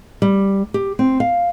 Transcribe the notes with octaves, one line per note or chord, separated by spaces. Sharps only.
G3
G4
C4
F5